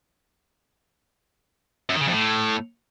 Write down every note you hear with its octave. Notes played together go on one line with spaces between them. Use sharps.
F#2
D#3
C#3
F2
A2